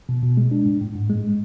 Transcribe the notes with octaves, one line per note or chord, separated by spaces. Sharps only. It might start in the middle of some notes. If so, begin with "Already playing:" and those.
B2
B2
G#3
D4
A2
A2
G#2
G#3